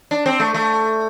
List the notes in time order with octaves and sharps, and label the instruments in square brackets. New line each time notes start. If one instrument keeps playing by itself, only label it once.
[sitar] D4
C4
A3
A3